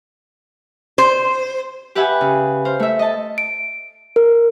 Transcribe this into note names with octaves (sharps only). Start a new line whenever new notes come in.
C5
G4 B4 E5 F#5 G#5
C#3
C5 F5
A3 E5
D#5 A5
D7
A#4